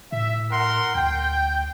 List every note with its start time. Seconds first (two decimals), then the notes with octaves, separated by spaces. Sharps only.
0.12 A2 E5
0.51 A#4 F#5 C6
0.95 D2 G5